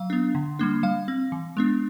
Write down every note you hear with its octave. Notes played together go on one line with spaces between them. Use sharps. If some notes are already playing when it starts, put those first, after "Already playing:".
Already playing: F#3 F5
B3 D4
D3
G3 A#3 D4
G3 F5
C4
E3
G#3 B3 D4